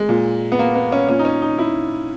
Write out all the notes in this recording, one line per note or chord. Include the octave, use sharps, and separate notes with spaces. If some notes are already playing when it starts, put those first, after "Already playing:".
Already playing: G#3
A#2
B3
A#3
B3
C#4
A#2 C#4
D#4
C#4
D#4
E4